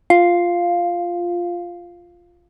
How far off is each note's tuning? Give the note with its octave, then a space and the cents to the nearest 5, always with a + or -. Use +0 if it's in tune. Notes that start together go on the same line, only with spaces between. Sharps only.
F4 +0 F5 +0